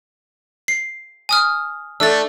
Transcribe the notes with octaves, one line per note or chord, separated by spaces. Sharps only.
C7
G#5 D#6 F6
A3 D4 E6 A6